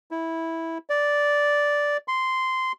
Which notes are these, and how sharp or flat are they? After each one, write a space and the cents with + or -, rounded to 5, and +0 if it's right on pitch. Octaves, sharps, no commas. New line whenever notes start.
E4 -10
D5 -5
C6 -10